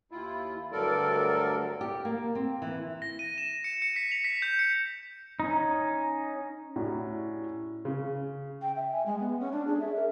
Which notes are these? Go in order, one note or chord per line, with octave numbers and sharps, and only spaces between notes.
D#2 E4 F4
D2 G2 F#3 A4 A#4 D5
G4
A#3
C4
E3
A#6
D#7
E7
C#7
C#7
B6
F7
B6
G6
C#7
C#4 D#4
A2 C#4 F#4 G4 D5 A#5
C#3
G5
E5
G#5
G#3
B3
C#4
D4
G#4
E5
A#4